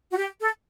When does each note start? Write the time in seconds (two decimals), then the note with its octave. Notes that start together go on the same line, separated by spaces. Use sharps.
0.11 F#4
0.17 G4
0.41 A4